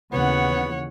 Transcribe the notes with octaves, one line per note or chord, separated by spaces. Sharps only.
D#2 C#3 E3 B3 C#5 F#5